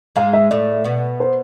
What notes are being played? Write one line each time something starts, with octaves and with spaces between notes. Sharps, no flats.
G#2 G#3 F5
E5
A2 A3 D5
B2 B3
C5